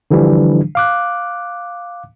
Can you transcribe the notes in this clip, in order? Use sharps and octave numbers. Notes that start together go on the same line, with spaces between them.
D3 E3 F3 G3 D4
F5 D6 F#6